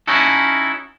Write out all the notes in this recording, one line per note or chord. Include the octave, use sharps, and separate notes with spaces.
C#4 D#4 E4 F#4 A4